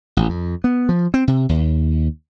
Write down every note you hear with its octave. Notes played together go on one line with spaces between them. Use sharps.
A1
F2
B3
F3
C4
C3
D#2